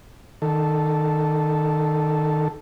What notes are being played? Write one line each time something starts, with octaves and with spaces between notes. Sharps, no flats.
D#3 A4